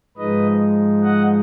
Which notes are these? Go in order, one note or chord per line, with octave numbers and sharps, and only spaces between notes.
G#2 F3 G#3 D#4 B4 D#5
D#5 F#5